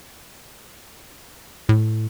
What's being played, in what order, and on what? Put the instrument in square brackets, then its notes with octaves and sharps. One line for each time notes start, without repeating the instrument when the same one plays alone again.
[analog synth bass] A2